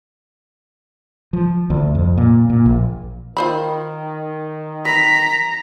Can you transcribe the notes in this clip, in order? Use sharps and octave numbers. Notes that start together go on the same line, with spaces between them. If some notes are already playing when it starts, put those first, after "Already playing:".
F3
D2
F2
A#2
A#2
A#1
D#3 F4 C5 B5
B4 A#5 B6